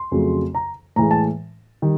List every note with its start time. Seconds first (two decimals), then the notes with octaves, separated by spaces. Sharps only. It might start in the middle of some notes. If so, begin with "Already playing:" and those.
Already playing: C6
0.11 F2 C#3 F#3 A3
0.55 A#5
0.96 A2 E3 G#3 A#5
1.11 A5
1.82 D#3 G3